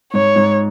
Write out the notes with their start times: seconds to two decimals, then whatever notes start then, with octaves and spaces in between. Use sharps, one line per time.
0.13 G#2 C#5
0.36 G#2